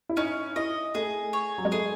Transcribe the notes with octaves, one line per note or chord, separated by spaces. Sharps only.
E4
C#4 D#4
E4 D#5
A3 G#4
C#5
F#3
G#3
A3 G#4